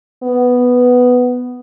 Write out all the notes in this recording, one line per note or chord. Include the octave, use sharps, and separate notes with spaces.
B3